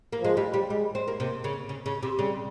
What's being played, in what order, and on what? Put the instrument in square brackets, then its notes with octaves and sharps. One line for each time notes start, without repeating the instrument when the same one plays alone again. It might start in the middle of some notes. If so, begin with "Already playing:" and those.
[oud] A#3
[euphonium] F3 [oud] G#3
[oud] G3
G3
[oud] G3 [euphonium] G#3
[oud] C4
A#3
[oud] C3 [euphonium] A#3
[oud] C#3
C#3
C#3
C3
[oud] C#3 [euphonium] G3